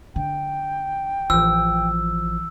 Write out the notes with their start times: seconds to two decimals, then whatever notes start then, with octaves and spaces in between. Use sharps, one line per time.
0.16 D3 G5
1.30 A1 E3 F3 E6